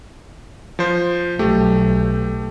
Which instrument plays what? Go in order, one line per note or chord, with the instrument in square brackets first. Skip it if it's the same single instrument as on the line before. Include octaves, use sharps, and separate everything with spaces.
[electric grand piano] F3 C5
[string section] B1 [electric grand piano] A3 G4